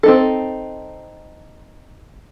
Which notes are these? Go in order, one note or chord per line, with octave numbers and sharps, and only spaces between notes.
C4 D#4 A4